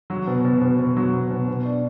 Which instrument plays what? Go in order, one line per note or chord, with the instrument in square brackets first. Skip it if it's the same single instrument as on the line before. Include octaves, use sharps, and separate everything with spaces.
[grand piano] F#3
B2
B2
B2
B2
F#3
B2
B2
B2
D4